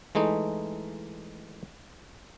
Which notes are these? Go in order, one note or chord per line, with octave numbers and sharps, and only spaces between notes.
E3 G#3 A3 D#4